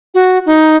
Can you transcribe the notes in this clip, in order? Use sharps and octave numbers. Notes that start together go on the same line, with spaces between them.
F#4
D#4